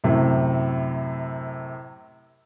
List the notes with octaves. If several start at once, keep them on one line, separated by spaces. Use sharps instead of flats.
F#2 A2 C3